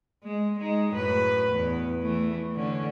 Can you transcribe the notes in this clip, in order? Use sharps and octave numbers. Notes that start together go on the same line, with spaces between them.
G#3
G#3 D#4
F#2 A2 B4
E2
E3 A3
D3 C#4